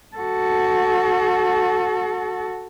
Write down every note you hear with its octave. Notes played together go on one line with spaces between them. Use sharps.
F#4 A4